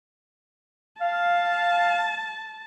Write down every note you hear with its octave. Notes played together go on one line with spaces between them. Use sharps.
F5 A5